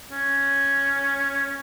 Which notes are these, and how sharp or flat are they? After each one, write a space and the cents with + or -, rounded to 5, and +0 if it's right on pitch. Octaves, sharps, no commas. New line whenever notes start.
C#4 +0